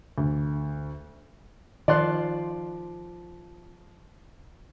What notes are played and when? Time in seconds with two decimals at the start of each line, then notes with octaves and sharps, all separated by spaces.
0.18 D2
1.88 D#3 F3 D5 F5 C6 F#6